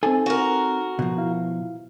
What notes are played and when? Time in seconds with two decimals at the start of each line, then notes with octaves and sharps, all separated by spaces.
0.03 C4 D#4 A4 G#5
0.26 F#4 A#4
0.99 B2 F3
1.18 E4 F5